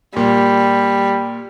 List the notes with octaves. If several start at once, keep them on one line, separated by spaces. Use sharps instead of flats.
A#2 G3